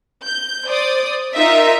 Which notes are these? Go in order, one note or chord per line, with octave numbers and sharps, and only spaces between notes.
G6
C5 D5 D#6
D#4 F4 A#4 E5